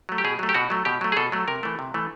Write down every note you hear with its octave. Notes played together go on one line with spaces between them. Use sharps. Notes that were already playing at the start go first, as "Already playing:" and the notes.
F#3 A3
G4
B2 G#4
F#3 A3
G4
B2 F#4
F#3 A3
B2 G4
F#3 A3
G#4
B2 A4
F#3 A3
C3 A#4
E3 A3
C3
E3 A3